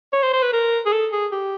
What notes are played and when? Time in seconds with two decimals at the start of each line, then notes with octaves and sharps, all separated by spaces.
0.13 C#5
0.23 C5
0.33 C5
0.42 B4
0.53 A#4
0.85 G#4
0.92 A4
1.12 G#4
1.32 G4